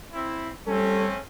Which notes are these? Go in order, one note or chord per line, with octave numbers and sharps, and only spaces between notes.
C4 E4
G3 A3 C4 C#4 A4